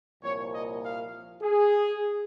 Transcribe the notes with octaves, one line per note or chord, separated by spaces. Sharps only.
C2 A#2 F3 A#3 C#5
D#5
F5
G#4